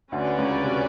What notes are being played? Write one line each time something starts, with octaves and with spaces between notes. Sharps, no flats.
D2 D3 C#4 F#4 B4 D5
C#2 C#3
C3